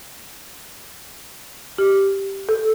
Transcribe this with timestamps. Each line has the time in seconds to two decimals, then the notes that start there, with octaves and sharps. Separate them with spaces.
1.78 G4
2.49 A4